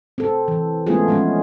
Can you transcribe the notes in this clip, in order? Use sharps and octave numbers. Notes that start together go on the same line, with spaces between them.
C4 A4
E3
G#3 A3 B3 C#4 F4 G#4
F3 G#3 C#4